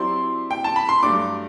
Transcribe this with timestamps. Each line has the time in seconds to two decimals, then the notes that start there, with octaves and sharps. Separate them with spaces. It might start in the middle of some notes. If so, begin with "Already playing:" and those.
Already playing: F#3 C4 E4 G4 D5 C6
0.51 G5
0.64 A5
0.76 B5
0.89 C6
1.02 G2 F#3 A3 D4 A4 D6